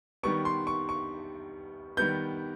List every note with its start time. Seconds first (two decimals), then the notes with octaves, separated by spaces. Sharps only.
0.23 D#3 G3 B3 C#6
0.45 C6
0.67 C#6
0.89 C#6
1.97 D#3 G3 B3 G6